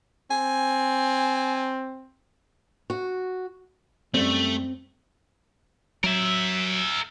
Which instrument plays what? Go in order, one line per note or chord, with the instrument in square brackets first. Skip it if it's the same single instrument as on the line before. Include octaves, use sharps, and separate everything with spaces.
[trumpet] C4 [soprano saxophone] G#5
[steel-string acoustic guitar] F#4
[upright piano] F#2 G3 [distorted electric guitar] A3 [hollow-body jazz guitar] C4
[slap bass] F#3 [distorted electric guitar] A#4 E5